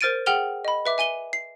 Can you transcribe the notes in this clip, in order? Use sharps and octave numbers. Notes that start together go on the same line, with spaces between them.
A#4 C5 F6 A6 D7 D#7
G#4 F#5 G5 F6 F7 G7
D#5 B5
B4 E5 D6
E5 G#5 D#7 G7
C7